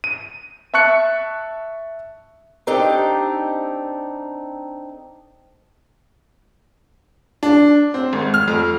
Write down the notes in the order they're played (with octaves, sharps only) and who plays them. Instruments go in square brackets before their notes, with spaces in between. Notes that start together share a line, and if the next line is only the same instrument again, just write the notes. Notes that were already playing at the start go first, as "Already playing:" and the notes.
[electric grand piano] D#7
E5 A5 C#6 F#6 C#7
[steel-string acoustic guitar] C4 D4 D#4 G4 A4
[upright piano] D4
C4
G#1
F6
F2